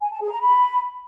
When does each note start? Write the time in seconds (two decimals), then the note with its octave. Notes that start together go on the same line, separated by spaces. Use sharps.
0.01 G#5
0.11 A5
0.21 G#4
0.30 A#5
0.40 B5